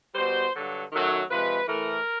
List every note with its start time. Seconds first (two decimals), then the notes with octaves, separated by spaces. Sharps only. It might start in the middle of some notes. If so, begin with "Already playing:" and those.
0.15 B2 G3 C5
0.53 G2 D3 F#3
0.91 F#2 D#3 F#3 A3
1.29 C3 F3 G#3 B4
1.67 A2 E3 A3 A#4